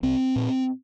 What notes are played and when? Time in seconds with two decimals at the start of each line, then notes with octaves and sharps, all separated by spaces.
0.03 C2 C4
0.36 A#2